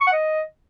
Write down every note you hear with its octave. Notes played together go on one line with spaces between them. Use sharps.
C#6
F#5
D#5